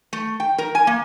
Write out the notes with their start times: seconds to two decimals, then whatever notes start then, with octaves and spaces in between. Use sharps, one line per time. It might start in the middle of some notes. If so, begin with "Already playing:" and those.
0.13 A3
0.40 G5
0.58 A#4
0.75 G#5
0.87 A#3